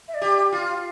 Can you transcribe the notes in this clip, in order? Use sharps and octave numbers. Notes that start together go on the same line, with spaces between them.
E5
D5
G4
F4
F5